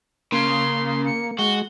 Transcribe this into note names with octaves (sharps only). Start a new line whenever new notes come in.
C#3 A#3 C6
C#7
G#3 F#4 G7